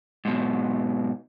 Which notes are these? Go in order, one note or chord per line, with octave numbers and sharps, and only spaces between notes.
G#2 B2